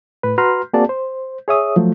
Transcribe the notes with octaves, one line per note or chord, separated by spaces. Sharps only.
A2 B4
F#4 B4 A#5 C6 F6
A#3 C4 F#4 G#4 D5 A5
C5
G#4 C#5 E5 D#6
F3 F#3 A3